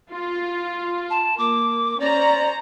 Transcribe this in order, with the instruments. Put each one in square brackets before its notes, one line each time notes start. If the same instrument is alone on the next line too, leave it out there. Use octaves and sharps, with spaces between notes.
[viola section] F4
[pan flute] A5
[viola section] A#3 [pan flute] D6
[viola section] C#4 C5 A#5 [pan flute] D5